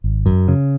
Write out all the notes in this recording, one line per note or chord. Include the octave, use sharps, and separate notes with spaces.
G#1
F#2
C#3